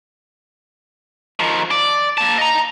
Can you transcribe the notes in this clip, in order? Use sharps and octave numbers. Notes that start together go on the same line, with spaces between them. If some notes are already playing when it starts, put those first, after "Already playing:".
D#3 F3
D5
A#3 A5
D#5 A#5